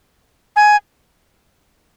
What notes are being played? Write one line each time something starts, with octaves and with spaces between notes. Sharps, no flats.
G#5